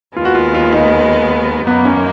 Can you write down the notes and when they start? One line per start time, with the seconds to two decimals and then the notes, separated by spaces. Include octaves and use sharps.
0.16 D#2 D#3 G#3 B3 F4
0.25 F#4
0.35 F4
0.54 F4
0.73 D#4
1.67 F#2 D#3 A#3 B3 D#4
1.85 C#4